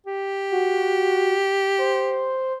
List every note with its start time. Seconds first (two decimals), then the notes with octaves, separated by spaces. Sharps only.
0.06 G4
0.52 F#4
1.78 C5